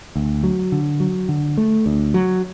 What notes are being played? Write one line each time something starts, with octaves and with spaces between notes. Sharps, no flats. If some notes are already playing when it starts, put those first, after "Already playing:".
D2
F#3
D3
F#3
D3
A3
D2
F#3